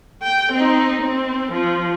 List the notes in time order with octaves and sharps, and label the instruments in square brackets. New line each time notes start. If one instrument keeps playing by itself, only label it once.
[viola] G5
C4 D#4
C4
F3